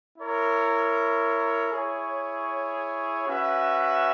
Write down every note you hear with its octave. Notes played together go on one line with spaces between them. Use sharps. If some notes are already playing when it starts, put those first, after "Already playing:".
E4 A#4 C#5
E4 G#4 C#5
C#4 F#4 B4 E5